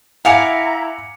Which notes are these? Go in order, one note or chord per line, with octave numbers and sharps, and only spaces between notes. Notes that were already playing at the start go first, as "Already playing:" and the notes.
E4 F5 F#5 G#5 A#5 D6 C#7 F7